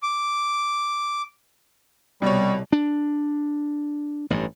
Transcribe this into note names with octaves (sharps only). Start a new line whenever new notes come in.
D6
C2 B2 G3 C#5
D4
A1 G2